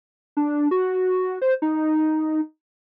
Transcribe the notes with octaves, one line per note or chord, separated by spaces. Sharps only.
D4
F#4
C5
D#4